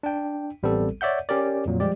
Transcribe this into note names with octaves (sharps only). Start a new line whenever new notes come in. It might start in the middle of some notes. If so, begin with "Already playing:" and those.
D4 G5
A1 G3 B3 C4 A4
C#5 D5 E5 F#5 G6
C#4 G4 A#4 D5
F2 A#2 F#3
F3 G3 G#3 G4 D5